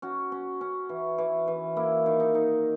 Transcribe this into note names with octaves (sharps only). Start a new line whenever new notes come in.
C#4 F#4
C#4
C#4
E3
E3
E3
A#3 E4
D#3
D#4
D#4